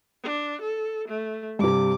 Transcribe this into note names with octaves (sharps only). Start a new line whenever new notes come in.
D4
A4
A3
G2 C3 D6